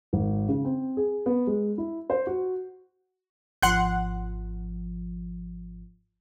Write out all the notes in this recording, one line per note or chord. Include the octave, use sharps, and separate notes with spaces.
G#1
C#3
C4
G#4
B3
G#3
E4
C5
F#4
G#1 F3 F#5 C6 F#6